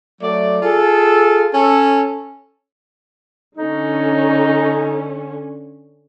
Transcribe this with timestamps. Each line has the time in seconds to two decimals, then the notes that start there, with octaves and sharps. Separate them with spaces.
0.21 F#3 A3 D5
0.62 F4 G#4 A4
1.54 C#4 A4
3.57 D3 C#4 D#4